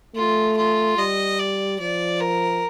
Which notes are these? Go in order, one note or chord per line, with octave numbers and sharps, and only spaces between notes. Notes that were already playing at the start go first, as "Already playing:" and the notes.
A3 F4
F4
G3 D#5
D5
F3 D5
A#4